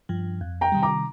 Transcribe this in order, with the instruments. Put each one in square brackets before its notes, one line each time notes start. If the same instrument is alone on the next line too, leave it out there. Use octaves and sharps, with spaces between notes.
[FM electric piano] G2 F3
F2
[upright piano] G5 A#5
[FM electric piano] C3 D#3 G3
[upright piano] A#5 D6